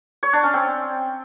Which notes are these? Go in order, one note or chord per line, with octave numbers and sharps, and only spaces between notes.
C#5
D4
C#4
C4